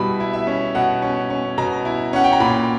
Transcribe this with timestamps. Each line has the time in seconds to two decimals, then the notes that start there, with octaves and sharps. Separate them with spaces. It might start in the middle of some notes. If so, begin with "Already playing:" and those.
Already playing: B2 G3 E4 B5
0.20 E4
0.33 E5
0.47 C#4
0.75 B2 F#5
1.02 C#4
1.30 C#4
1.58 B2 A#5
1.85 E4
2.13 C#4 F#5
2.24 G5
2.33 A#5
2.40 A#2 B5